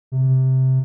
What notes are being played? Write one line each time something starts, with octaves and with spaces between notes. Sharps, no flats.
C3